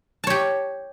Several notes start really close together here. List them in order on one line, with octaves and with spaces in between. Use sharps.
A5 C#5 G4